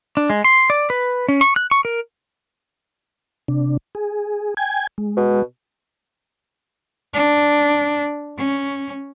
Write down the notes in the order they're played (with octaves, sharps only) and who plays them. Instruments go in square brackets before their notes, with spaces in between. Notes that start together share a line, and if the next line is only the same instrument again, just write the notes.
[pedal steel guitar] D4
G#3
C6
D5
B4
C#4
C#6
F#6
C#6
A#4
[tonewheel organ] C3 D4
G#4
G5 G#5 G#6
G#3
[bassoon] B2
[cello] D4
C#4